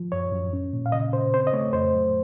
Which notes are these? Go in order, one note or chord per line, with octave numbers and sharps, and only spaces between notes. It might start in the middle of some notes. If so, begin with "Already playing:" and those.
Already playing: F3
F#2 C#5
F#2
C#4
A#2
F5
C#3 D#5
C#3 C5
C4 C5
D#5
A3 C#5
F2 C5
F#3